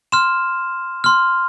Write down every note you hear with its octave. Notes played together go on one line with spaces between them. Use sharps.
C6 F6 E7
C6 F6